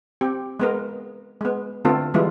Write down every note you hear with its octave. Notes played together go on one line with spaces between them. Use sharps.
C4 G4
G#3 B3 A#4
G#3 B3
D3 A3 B3 C4 F4 A4
E3 G3 G#3 B3 E4 F4